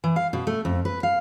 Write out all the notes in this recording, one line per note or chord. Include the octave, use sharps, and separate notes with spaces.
E3
F5
B2
A3
F2
B4
F5